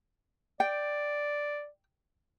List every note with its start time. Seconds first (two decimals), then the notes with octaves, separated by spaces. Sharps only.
0.60 D5 G5